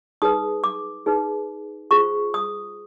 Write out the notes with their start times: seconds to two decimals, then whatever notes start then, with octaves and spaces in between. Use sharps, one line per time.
0.22 D#4 G#4 B4 D#6
0.64 D6
1.06 D#4 G#4 B4
1.91 F4 G#4 C5 C#6
2.34 D#6